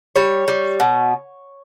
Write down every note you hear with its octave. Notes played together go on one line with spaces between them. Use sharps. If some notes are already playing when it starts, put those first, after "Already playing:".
G3 C#5
G3
B2